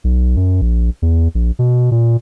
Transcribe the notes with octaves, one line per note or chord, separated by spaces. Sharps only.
B1
F#2
A#1
E2
A#1
B2
A#2